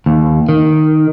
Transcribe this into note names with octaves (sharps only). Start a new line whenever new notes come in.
D#2
D#3